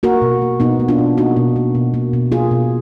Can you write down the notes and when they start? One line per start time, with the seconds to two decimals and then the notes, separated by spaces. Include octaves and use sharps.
0.03 A#3 F#4 A#4
0.22 B2
0.42 A#3
0.60 B2 B3 D#4
0.80 A#3
0.88 D4 F4
0.98 B2
1.17 A#3 D#4 F#4
1.36 B2
1.56 A#3
1.75 B2
1.94 A#3
2.13 B2
2.32 A#3 F4 G#4
2.51 B2